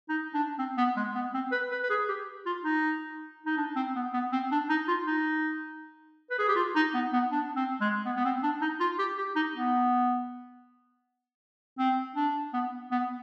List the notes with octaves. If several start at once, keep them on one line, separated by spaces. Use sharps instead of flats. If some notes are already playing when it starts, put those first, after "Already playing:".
D#4
D4
C4
B3
G#3
B3
C4
B4
B4
B4
G#4
G4
F4
D#4
D#4
D4
C4
B3
B3
C4
D4
D#4
F4
D#4
B4
G#4
G4
F4
D#4
B3
B3
D4
C4
G#3
B3
B3
C4
D4
D#4
F4
G4
G4
D#4
B3
C4
D4
B3
B3